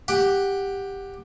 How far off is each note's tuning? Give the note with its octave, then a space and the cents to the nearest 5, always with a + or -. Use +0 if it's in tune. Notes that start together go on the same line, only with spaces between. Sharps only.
G4 +10 F#5 +0